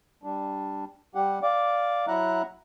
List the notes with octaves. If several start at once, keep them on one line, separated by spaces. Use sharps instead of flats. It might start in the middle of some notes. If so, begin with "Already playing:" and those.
G3 D4
G3 G4 F#5
D5 F5 D6
F#3 E4 E5 F#5 A#5 F#6